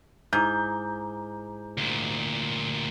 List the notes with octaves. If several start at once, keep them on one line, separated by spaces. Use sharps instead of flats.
G#2 E4 A#5 D6 G6
D2 A#2